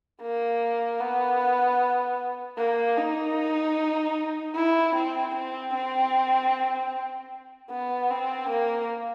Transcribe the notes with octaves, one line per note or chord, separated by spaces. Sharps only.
A#3
B3
A#3
D#4
E4
C4
C4
C4
B3
C4
A#3